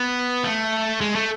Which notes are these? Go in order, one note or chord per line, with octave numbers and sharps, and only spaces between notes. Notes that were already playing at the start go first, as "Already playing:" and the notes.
Already playing: B3
A3
G#3
A3